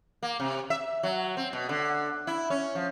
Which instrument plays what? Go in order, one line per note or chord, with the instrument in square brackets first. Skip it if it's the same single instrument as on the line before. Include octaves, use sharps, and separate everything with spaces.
[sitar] A#3
C3
E5
F#3
C4
B2
D3
E4
C#4
F3